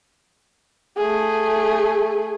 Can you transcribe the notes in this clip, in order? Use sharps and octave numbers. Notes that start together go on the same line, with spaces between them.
A3 G#4